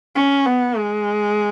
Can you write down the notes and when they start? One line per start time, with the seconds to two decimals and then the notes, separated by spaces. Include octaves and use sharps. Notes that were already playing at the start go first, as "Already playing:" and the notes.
0.16 C#4
0.46 B3
0.77 G#3